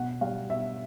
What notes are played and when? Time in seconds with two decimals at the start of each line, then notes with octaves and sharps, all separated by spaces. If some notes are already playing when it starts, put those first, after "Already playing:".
Already playing: B2 F#5
0.21 G3 F5
0.50 B2 E5